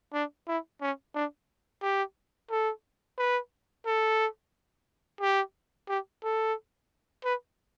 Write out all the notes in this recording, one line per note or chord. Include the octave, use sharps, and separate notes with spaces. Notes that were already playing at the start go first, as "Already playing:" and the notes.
D4
E4
C#4
D4
G4
A4
B4
A4
G4
G4
A4
B4